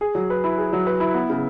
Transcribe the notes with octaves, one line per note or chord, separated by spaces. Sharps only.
G#4
F#3
B4
E4
G#4
F#3
B4
E4
B3
C#3